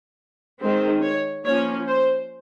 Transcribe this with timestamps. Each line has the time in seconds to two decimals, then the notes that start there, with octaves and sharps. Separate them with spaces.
0.60 D#3 G#3 C4
1.02 C#5
1.45 F3 A#3 C#4 C#5
1.88 C5